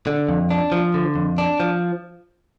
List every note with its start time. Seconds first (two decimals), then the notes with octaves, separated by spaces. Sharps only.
0.07 D3
0.29 F2
0.50 D4
0.72 F3
0.94 D3
1.16 F2
1.38 D4
1.60 F3